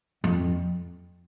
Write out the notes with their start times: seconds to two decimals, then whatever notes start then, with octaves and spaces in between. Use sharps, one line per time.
0.24 F2